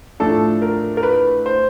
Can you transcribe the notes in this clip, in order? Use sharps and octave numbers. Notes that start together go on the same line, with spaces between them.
A2 F3 A3 D4 A4
A#4
A#4
B4
C5